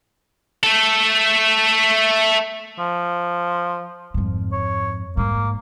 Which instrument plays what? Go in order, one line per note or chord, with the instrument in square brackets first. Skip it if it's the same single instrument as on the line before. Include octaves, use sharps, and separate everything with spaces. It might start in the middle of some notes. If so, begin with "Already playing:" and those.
[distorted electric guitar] A3 A4
[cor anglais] F3
[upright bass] F2 G#2
[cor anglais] C#5
[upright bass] G#2 [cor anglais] A#3